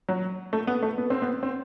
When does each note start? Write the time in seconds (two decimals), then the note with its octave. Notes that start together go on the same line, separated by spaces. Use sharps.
0.09 F#3
0.53 A3
0.67 B3
0.83 A3
0.98 B3
1.10 C4
1.22 B3
1.43 C4